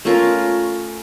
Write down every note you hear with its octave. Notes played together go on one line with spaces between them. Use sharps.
A3 C#4 F4 A#4